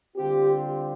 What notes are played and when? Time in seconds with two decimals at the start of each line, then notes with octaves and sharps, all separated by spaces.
0.16 D3 G3 C4 F4 G4